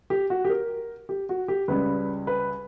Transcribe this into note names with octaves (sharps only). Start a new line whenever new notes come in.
G4
F#4
G4
A#4
G4
F#4
G4
C#2 C#3 G3 B4
B4